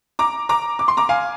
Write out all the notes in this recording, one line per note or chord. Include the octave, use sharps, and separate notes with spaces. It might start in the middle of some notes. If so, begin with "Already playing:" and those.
A#5 D6
A#5 D6
D6
C6
A#5 D6
F5 G#5